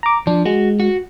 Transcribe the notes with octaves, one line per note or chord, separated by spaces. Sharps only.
A#5 D6
F3 D4
G#3 F#4
F#4